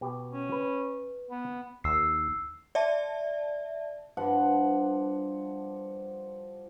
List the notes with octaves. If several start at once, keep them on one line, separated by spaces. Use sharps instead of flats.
B2 G4
C#4
B4
B3
D#2 E6 C7
D5 E5 A5
G2 F3 F#5